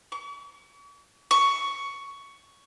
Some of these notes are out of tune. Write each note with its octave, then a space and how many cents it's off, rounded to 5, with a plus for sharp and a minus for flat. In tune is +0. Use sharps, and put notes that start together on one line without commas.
C#6 +45
C#6 +10